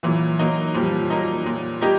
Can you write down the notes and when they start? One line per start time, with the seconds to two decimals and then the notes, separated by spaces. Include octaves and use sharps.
0.03 A#2 E3 F#3
0.39 F#3 A#3 D#4
0.74 A#2 F3 G3
1.10 F#3 A#3 D#4
1.46 A#2
1.81 G3 A#3 D#4 G4